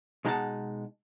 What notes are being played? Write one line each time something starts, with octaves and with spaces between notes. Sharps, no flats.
B2 G#3 D#4 E4 F#5 A5